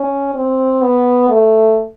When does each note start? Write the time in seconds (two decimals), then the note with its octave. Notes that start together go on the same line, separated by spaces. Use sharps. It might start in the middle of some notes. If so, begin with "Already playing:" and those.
Already playing: C#4
0.34 C4
0.82 B3
1.29 A3